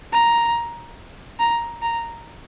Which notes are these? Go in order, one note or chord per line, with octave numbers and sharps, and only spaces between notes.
A#5
A#5
A#5